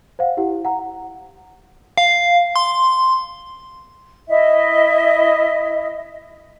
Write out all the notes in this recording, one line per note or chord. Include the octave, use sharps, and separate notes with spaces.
C5 F5 F#5
E4 G4 F#5
F#5 A#5
F5
C6
E4 D#5 E5